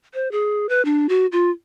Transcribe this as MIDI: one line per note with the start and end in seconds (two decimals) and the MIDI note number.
0.14 0.31 72
0.32 0.69 68
0.69 0.84 71
0.85 1.07 62
1.09 1.27 66
1.32 1.51 65